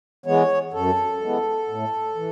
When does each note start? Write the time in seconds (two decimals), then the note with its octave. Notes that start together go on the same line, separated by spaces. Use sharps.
0.26 E3 G#3 B3 C#5
0.73 F#2 A4
1.21 E3 G#3 B3
1.68 A2
2.16 E3